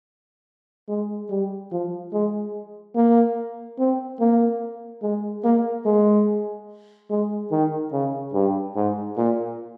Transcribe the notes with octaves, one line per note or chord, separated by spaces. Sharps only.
G#3
G3
F3
G#3
A#3
C4
A#3
G#3
A#3
G#3
G#3
D#3
C#3
G2
G#2
A#2